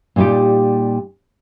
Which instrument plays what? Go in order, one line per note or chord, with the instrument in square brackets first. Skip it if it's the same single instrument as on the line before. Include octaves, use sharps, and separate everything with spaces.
[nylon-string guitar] A#2 G3 D#4 F4 G4